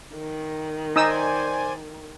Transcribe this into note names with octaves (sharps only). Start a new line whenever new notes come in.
D#3
D#4 C5 D5 G#5 D#6 E6